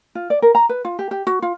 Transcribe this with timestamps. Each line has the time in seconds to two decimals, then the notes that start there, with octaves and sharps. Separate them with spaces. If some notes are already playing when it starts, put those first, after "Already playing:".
0.15 F4
0.30 D5
0.42 A#4
0.55 A#5
0.69 B4
0.85 F4
0.99 G4
1.11 G4
1.27 F#4
1.42 F4